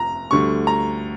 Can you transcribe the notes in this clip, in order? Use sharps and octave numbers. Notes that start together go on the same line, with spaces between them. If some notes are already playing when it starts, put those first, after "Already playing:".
Already playing: F1 A#5
D2 D3 G3 C#6
A#5